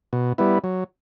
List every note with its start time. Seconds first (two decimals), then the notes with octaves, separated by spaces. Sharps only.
0.13 B2
0.38 G3 B3 E4
0.64 F#3